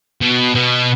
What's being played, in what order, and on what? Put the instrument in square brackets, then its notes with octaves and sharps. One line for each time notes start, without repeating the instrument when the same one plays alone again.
[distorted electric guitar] B2
B2